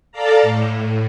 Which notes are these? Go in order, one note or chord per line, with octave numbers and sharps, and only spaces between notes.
A4 D5 F5 A5 A#5
A2